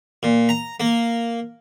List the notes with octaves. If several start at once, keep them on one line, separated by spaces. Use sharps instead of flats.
A#2
A#5
A#3